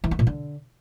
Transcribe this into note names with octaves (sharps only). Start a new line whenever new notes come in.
E3
A3
A#2
D3